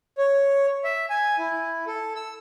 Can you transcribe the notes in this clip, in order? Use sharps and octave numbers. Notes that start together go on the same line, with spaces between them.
C#5
E5
G#5
E4
A4
E6